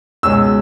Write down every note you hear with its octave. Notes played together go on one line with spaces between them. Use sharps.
C#2 B2 G#3 C#4 E6